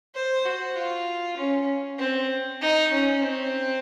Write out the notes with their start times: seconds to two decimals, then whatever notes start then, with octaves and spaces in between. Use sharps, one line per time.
0.15 C5
0.45 F#4
0.75 F4
1.37 C#4
1.98 C4
2.61 D#4
2.92 C#4
3.22 C4